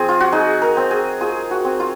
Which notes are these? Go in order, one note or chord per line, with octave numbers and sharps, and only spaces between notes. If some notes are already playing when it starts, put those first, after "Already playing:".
Already playing: F3 C4 G#4
F4
F#4
D#4 G#4
A#4
C4
G#4
F4 G#4
F#4
C4
F4